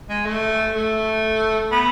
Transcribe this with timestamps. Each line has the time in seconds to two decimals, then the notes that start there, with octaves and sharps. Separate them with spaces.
0.10 G#3
0.25 A3
0.74 A3
1.71 B3